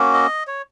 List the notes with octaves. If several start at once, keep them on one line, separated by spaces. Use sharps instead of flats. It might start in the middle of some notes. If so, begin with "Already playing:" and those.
Already playing: A#3 C#4 F#4
D#5
C#5